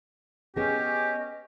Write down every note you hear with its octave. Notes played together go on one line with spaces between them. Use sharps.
B3 C#4 G4 G#4 D#5